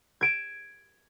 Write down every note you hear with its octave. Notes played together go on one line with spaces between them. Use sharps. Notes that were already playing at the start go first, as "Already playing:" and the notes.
G#6 D7 E7